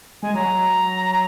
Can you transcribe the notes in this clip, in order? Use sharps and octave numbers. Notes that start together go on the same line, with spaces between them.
G#3 G#5
F#3 A#5